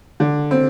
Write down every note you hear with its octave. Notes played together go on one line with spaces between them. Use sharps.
D3
C4